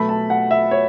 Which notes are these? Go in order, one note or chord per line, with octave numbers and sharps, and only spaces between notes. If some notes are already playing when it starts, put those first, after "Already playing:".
Already playing: B2 F#3 A3 B5
A5
F#5
E5
C#5